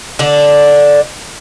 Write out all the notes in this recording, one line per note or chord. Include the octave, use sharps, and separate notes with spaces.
D3 D4